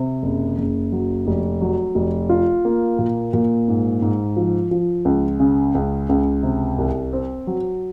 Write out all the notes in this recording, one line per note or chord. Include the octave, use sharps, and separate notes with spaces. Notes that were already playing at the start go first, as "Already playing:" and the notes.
Already playing: C3
F#1
F#1
F#3
F1
F#3
F1
F4
A#3
A#2
A#2
G#2
G#2
F3
F3
C#2
C#3
C#2
C#2
C3
C2
C4
F#3